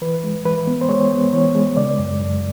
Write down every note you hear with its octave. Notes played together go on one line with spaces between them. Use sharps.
E3 B4
G#3
E3 B4
B3
C5
G#3 C#5
B3
E3 C#5
G#3
C#3 D5
F#2
F#2